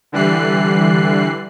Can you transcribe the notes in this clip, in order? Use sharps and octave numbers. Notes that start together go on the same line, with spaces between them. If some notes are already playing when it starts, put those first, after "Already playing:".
D3 E3 G3 F#6 C7